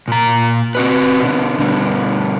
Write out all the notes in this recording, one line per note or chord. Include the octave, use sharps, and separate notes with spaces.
A#2 A#5
C4 F#4 B4
B2 D3
B2 D3 G3